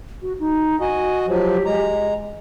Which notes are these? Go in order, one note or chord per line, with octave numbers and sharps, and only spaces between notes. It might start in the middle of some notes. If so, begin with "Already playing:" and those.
F#4
D#4
F#4 D#5 G#5
F3 F#3 G4
G#3 A#5